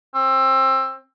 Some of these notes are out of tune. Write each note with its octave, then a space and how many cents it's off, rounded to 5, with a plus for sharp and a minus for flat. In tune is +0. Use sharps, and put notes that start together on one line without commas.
C4 +25